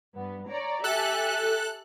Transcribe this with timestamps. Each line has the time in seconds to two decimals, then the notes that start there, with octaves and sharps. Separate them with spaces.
0.15 G2 B3
0.49 C#5 D5 A#5
0.84 G4 A4 E5 G#5 F#6